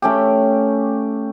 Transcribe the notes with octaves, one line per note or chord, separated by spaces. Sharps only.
A3 C#4 G4